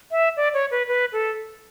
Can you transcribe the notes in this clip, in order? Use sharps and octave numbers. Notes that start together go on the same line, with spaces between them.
E5
D5
C#5
B4
B4
A4